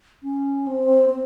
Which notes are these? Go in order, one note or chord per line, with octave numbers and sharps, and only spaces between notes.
C#4
C4
C4